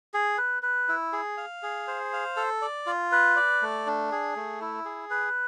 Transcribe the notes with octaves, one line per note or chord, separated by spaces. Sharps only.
G#4
B4
B4
E4
G#4
F5
G#4
C5
F5
A4
D5
F4
B4
D5
A3
D4
G#4
A3
E4
G#4
B4